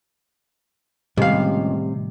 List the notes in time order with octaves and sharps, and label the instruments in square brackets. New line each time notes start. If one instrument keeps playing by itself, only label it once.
[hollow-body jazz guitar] C#2 F5 [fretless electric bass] A2 D#3 [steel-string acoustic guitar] C3 [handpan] G3 G4